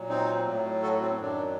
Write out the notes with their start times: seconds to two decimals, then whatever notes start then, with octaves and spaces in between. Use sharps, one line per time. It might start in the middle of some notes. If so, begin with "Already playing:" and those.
Already playing: A#2 F#3
0.09 C4 D#4
0.45 A2 F#3
0.82 F#4 A4
1.01 C4
1.19 F#2 D#3 F#3 D4